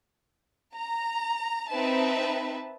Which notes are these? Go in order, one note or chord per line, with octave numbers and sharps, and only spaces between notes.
A#5
C4 D#4 B4 E5 A5